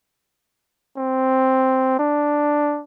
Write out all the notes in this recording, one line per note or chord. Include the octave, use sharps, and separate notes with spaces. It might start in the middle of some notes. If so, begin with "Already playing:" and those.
C4
D4